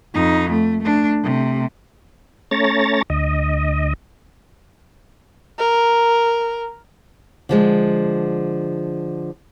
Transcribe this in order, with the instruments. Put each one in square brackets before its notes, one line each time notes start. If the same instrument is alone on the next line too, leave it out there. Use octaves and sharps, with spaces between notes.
[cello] F2 D#4
A3
A3 D4
C3 A3
[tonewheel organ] A3 C#4 C#5 A#5 A6
D2 D#5
[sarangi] A#4
[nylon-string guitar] D3 F3 G#3